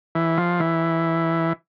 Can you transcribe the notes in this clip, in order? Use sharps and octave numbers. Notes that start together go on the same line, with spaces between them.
E3
F3
E3